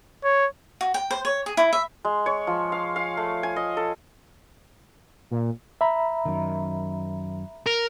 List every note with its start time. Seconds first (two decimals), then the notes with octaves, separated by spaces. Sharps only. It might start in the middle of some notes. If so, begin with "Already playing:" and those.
0.24 C#5
0.81 F#4
0.94 G5
1.11 C5
1.25 C#5
1.46 G#4
1.57 E4
1.73 E5
2.05 G#3
2.26 C#5
2.47 F3
2.72 F5
2.96 F5
3.17 A3
3.43 G#5
3.56 D#5
3.77 A4
5.31 A#2
5.81 E5 A#5 B5
6.25 F#2 D#3
7.66 A#4